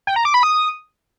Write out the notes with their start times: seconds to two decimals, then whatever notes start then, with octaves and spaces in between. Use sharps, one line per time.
0.07 G5
0.16 A#5
0.25 D6
0.34 B5
0.43 D#6